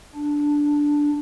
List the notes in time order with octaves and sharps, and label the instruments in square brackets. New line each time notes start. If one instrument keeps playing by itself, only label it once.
[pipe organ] D4